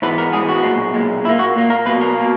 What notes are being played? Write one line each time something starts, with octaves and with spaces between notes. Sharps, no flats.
G#2 E3 G#3 B3 B4
A#4
G#2 E3 G#3 B3 G#4
F#4
B1 A#2 G#3
B1 A#2 G#3
A#2 A#3 E4
F#4
A#2 A#3
A#4
B1 B2 A#3 B4
A#4
B2 A#3